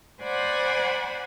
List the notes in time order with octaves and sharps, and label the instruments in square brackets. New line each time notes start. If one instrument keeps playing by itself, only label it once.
[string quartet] C5 D5 F#5 G#5 B5